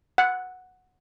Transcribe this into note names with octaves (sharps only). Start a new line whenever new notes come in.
F#5